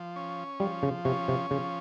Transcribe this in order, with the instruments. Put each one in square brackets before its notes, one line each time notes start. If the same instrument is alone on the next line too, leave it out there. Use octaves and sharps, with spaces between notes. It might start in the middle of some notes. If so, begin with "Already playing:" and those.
Already playing: [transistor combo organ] F3
C#4
[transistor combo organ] F3 [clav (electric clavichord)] G3
[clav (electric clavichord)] C#3
[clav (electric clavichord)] C3 [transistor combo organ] C#4
[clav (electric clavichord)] C3
[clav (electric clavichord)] C#3 [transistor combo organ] F3